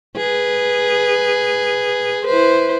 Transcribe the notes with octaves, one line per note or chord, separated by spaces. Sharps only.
G#4 B4
E4 B4 C5